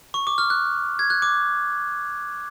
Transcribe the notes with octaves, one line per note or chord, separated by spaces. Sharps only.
C#6
D6
F6
F#6
G#6
F#6
D6